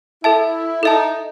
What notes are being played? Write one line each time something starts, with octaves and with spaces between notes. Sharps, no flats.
E4 A4 E5 A5
D#4 A4 E5 A5